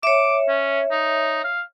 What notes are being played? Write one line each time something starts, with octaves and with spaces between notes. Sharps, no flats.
C#5 E5 D6
C#4
D#4
F5